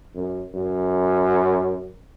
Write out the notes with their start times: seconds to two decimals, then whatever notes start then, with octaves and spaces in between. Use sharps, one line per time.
0.15 F#2
0.54 F#2